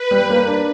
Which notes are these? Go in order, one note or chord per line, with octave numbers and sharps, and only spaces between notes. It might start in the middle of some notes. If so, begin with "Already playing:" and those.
Already playing: B4
G3
A#3
D4